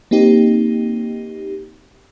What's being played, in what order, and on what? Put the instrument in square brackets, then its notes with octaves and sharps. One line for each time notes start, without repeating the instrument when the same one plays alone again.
[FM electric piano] A#3 C4 D#4 G4